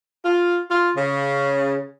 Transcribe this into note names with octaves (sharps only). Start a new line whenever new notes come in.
F4
F4
C#3